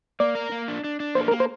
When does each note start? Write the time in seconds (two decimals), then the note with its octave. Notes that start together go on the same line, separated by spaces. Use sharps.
0.20 A#3 D5
0.35 A#4
0.52 A#3
0.68 D4
0.84 D4
1.00 D4
1.15 A#3 C5
1.28 A#4
1.31 A#3
1.40 C5